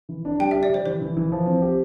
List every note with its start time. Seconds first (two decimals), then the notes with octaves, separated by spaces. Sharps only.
0.09 E3
0.25 D4
0.40 G3 G5
0.51 E5
0.56 G3
0.63 D5
0.70 G3 C5
0.86 E3 C5
1.01 E3
1.17 E3
1.32 F3
1.46 C4
1.62 G4